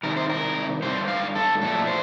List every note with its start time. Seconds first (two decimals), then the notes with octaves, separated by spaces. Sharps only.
0.03 C3 D#3 G3 A#4
0.17 C5
0.29 A#4
0.82 G2 D3 G3 C5
1.08 F5
1.35 A4
1.61 A#2 F3 A3 A4
1.87 C5